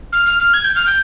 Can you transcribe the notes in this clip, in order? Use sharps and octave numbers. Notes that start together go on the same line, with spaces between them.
F6
F6
F6
G#6
G6
F6
G6